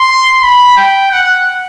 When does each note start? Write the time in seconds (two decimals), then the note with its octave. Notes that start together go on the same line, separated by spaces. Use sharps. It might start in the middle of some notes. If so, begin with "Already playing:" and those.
Already playing: C6
0.41 B5
0.77 G5
1.11 F#5